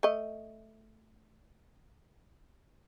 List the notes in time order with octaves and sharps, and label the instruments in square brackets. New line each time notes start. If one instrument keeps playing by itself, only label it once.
[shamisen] A3 D#5